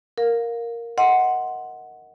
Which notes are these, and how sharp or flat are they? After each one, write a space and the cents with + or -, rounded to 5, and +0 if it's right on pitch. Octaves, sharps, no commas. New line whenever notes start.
A#4 +0 F5 +20
D#5 +20 F#5 +0 C6 +0